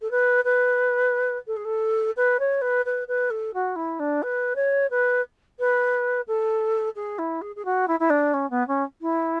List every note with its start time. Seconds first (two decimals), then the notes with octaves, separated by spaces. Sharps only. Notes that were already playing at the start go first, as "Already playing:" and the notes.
0.01 A4
0.11 B4
0.45 B4
1.47 A4
1.57 G#4
1.65 A4
2.17 B4
2.40 C#5
2.62 B4
2.85 B4
3.08 B4
3.30 A4
3.54 F#4
3.76 E4
3.99 D4
4.23 B4
4.56 C#5
4.91 B4
5.59 B4
6.28 A4
6.96 G#4
7.18 E4
7.42 G#4
7.56 G#4
7.65 F#4
7.88 E4
8.00 E4
8.10 D4
8.34 C#4
8.50 B3
8.68 C#4
9.01 E4